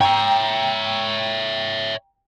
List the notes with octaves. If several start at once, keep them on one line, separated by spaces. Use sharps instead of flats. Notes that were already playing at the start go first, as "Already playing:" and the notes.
C#5 E5 G5 A#5